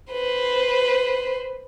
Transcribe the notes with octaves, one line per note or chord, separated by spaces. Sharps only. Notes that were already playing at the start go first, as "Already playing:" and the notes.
B4 C5